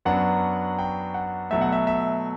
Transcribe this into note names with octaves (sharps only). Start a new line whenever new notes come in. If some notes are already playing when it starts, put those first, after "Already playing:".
F#2 F#3 B3 D4 F#5
G5
F#5
B2 F#3 A3 E5
F#5
E5
E5